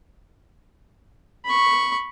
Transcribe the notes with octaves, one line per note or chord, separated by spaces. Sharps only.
B5 C#6